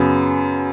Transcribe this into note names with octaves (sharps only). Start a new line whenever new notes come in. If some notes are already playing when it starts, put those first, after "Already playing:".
Already playing: F#2 C#3 B3